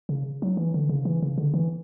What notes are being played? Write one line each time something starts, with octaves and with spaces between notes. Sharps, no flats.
C#3
F#3
E3
D3
C#3
E3
C#3
D3
E3